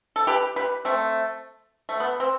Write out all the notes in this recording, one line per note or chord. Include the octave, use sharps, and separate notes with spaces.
A4
G4 B4
G4 B4
A3 C4
A3
B3
C4